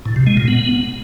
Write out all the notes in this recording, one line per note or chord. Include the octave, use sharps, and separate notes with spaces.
A2
C3
G#3
A#2
B3